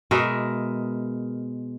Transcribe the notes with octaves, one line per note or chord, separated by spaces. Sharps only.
B2 G#3 A#4 E5